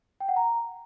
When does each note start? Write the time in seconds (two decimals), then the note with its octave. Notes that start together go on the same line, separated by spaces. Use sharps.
0.20 G5
0.28 F#5
0.36 A#5